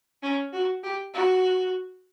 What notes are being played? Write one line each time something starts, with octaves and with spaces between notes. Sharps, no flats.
C#4
F#4
G4
F#4